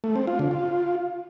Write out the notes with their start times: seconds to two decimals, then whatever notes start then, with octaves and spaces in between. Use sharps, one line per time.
0.04 A3
0.16 C4
0.27 F4
0.39 D3
0.51 F4